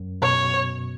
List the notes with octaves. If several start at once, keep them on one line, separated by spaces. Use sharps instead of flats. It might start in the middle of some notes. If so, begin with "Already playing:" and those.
Already playing: F#2
B2 C#5